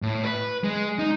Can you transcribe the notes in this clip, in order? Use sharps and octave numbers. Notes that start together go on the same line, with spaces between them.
A2
B4
G#3
D#4